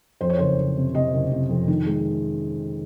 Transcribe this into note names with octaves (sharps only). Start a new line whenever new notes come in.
F2 C5
C#5
F#1 C5
F#1
C3
C3 D#5
F#1
C3
F2
D#3
G#3